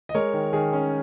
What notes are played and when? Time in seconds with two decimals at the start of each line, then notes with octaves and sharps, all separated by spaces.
0.09 D#5
0.14 G#3 A#4 C#5
0.33 D#3
0.53 D#3 G#4
0.73 C#4